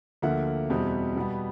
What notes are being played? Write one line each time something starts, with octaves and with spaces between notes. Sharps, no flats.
D2 D3 F3 A#3 E5 F#5
E2 B2 G3 C4
B2 G3 B3